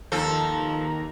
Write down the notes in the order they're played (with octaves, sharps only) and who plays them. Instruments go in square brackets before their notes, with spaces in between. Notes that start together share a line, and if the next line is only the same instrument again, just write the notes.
[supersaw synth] D#2 D#3 A#5 [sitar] F3 A4